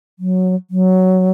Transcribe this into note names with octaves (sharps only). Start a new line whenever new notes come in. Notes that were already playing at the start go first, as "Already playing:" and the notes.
F#3
F#3